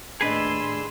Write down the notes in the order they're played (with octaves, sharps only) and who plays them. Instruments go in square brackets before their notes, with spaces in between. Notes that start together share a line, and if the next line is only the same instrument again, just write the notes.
[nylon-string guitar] D#2 D4 D#5 [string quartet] A2 C6 E6 [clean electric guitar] G#4 B4